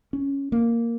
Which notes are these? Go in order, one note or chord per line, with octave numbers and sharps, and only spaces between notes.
C#4
A#3